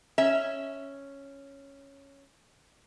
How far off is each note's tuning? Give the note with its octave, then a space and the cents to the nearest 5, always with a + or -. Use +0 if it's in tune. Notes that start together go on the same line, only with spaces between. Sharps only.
C#4 +0 E5 +0